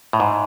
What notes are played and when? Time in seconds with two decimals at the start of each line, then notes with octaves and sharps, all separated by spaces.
0.13 A2
0.20 G#2